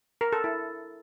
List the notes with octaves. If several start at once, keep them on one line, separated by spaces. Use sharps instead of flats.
A#4
A4
E4